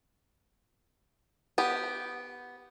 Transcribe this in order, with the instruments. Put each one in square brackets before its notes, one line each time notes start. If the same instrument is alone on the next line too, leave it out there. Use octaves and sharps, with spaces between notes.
[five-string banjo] B3 G4